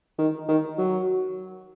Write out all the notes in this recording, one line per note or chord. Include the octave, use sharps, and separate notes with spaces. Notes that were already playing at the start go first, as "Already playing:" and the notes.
D#3
D#3
F#3